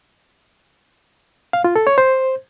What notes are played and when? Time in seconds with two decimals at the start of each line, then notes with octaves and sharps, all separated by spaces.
1.53 F5
1.64 F4
1.76 A4
1.87 C#5
1.98 C5